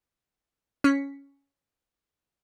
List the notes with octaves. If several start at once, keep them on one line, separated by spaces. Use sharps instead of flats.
C#4 B6 C#7